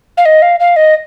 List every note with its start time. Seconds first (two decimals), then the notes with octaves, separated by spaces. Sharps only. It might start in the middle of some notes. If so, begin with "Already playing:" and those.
0.17 F5
0.25 D#5
0.42 F5
0.60 F5
0.76 D#5